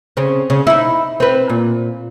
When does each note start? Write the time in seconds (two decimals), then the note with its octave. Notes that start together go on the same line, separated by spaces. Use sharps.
0.17 C#3 C4
0.50 C#3
0.67 D#4 E4
1.20 C4 B4
1.50 A#2